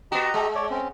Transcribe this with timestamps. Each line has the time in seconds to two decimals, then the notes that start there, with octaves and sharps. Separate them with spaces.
0.12 B3 F#4 G4 D#5 A#5
0.34 G#3
0.55 C#5 D5
0.71 C4 C#4